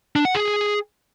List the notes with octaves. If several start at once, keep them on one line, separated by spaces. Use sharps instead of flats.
D4
F#5
G#4